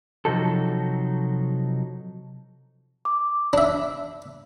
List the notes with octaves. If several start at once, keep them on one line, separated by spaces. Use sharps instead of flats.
C3 F3 F#3 D#4 F#4 A4
D6
D4 E5